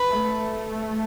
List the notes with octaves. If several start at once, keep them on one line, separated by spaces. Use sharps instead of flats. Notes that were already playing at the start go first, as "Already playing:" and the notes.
Already playing: B4
A3